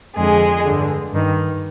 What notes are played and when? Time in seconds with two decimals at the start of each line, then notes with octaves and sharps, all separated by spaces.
0.17 F2 D3 G#3 G#4
0.65 G2 D3
1.13 G2 D#3